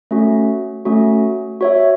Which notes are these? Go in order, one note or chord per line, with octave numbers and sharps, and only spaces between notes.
A3 C#4 F#4
A3 C#4 F#4
F#4 C#5 E5